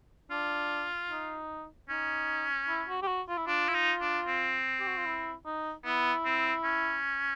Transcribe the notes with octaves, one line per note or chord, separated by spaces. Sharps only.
D4 F4
D#4
C#4 D#4
E4
F#4
G4
F#4
F4
E4
D4 F4
E4
D#4
D4
C4
G4
F#4
F4
E4
D#4
B3 E4
C4
C#4